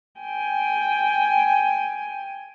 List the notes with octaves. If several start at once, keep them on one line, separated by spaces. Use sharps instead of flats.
G5 G#5